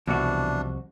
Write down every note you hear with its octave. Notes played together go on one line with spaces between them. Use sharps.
C2 F2 B2 E3 D4 F#4